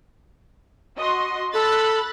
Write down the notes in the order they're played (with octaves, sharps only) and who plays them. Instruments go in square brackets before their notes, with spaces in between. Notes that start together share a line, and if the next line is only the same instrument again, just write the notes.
[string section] F#4 D#5 C6
[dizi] A4 [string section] B5 F#6 A6